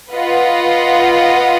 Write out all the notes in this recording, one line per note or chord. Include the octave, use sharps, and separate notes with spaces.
F4 B4 D#5 F#5